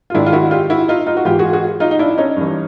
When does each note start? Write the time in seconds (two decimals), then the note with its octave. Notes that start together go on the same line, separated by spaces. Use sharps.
0.10 F4
0.14 G#2 D#3 D4 E4
0.26 F4
0.33 E4 F#4
0.51 F4 G4
0.70 E4 F#4
0.88 D#4 F4
1.06 D#4 F4
1.17 F#4
1.25 G#2 E3 F4 G4
1.39 F#4 G#4
1.53 F#4 G#4
1.80 D#4 F4
1.91 D#4
1.99 D4 E4
2.18 C#4 D#4
2.36 G2 E3